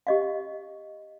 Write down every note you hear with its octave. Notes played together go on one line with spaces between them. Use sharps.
G4 D#5 F5